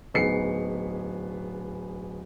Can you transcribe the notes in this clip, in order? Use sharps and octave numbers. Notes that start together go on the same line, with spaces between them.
D1 B3 D#4 G#4 C7 C#7